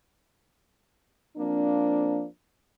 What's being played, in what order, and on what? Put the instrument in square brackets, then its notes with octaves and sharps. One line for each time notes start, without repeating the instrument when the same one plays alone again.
[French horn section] F3 A#3 C4 D4